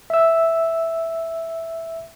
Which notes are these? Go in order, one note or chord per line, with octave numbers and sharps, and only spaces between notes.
E5 E6